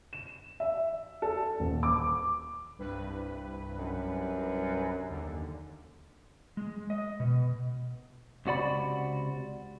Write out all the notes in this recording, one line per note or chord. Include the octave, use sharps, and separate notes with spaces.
E7
E5
A4
D#1
D6
C2 G2 B4
F#2
D#2 D3
G#3
D#5
B2
C#2 C3 F#4 D5 B5